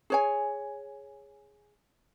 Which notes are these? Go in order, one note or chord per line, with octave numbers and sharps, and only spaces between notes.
G#4 C#5 G#5